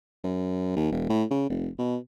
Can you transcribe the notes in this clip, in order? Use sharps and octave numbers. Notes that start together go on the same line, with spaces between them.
F#2
D#2
E1
A2
C#3
F1
B2